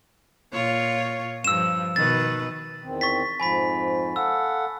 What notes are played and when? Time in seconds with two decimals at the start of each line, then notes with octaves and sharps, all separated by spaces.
0.53 A#2 F4 C#5
1.45 G2 F3 E6 E7
1.96 B2 D#3 B4 A6
2.84 E2 D#3 C4
3.01 C#6 A6 B6
3.40 F2 G#2 F3 G#5 B5 B6
4.16 A4 F5 F#5 E6